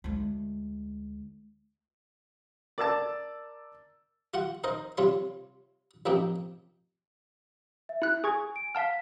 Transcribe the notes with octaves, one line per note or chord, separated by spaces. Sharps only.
D2 G#3
A#4 D5 A5 E6 A6
F4 F#4 F#5
D#4 A#4 C5 D#5
C3 G3 F4 C#5 C6
A1 F3 A#3 C4 D#4 G4
E5
E4 F#6
G#4 G#5 C#6 G#6
D7
F5 F#5 A5 F6 B6